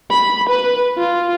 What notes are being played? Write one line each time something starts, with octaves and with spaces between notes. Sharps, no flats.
B5
B4
F4